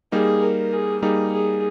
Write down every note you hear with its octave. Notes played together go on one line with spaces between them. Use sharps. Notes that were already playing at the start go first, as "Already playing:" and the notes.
G3 A#3 D#4 G#4
A#4
G#4
G3 A#3 D#4 G#4
G#4